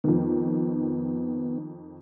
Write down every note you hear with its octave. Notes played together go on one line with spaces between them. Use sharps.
F2 D#3 B3